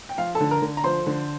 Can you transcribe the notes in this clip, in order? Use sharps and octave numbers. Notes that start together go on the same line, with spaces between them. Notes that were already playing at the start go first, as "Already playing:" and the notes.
G5
F3 F4 F5
A4 A5
D3
A#4 A#5
D3
A#5
F3 C5 C6
D3